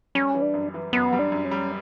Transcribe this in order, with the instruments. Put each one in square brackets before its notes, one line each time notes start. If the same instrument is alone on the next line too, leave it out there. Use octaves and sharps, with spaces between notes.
[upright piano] G3 [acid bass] C#4
[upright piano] E3
[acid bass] D4
[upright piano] F#2
E3
[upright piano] F#2 [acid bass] B3
[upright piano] G3
[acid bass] D4
[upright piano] F#2
[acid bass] C#4
[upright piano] G3